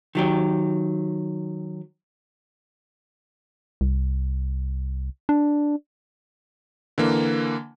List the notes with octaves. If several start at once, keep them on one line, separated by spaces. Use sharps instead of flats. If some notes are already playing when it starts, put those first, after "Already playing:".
D#3 F#3 G4
C2
D4
D3 E3 A#3